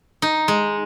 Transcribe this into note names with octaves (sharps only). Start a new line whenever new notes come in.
D#4
G#3